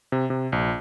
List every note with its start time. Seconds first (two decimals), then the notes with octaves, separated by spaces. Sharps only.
0.12 C3
0.30 C3
0.52 A#1